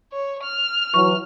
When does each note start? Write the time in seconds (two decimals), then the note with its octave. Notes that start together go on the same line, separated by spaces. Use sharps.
0.12 C#5
0.43 F6
0.94 E3 F#3 C#6